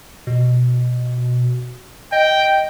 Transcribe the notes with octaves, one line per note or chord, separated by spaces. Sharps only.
B2
D#5 G5